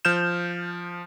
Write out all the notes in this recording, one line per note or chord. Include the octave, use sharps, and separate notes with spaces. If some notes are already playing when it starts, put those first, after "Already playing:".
F3 F6 G6 E7